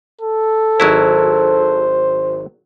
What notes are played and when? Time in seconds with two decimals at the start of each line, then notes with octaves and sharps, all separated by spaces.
0.22 A4
0.80 G#1 F#3 E4 C5